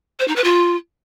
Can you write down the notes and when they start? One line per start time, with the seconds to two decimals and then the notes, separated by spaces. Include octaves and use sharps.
0.19 C5
0.28 D#4
0.36 B4
0.44 F4